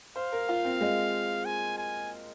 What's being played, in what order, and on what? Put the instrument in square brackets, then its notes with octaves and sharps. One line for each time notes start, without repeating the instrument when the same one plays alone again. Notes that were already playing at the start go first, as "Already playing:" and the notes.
[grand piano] C5 [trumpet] F5
[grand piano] A#4
F4
C4
G#3
[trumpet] G#5
G#5